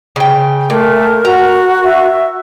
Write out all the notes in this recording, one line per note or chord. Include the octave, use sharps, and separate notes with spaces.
C#3 G5
A#2 A3 A#4
F#4 A#5
E5